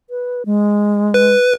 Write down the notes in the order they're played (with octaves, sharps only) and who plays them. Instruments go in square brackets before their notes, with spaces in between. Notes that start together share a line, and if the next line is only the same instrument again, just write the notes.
[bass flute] B4
G#3
[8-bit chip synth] B4